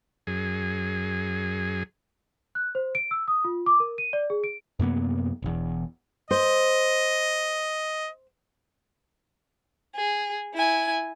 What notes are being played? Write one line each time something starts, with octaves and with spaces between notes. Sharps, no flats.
F#2 G#4
F#6
C5
D7
E6
D#6
F4
D6
A#4
D#7
D5
G#4
D7
F#2 C3 A#3 B3
E1 E2
C5 D#5
G#4
E4 G#5